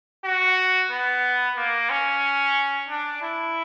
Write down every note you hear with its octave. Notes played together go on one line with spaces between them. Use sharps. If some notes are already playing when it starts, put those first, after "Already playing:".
F#4
B3
A#3
C#4
D4
E4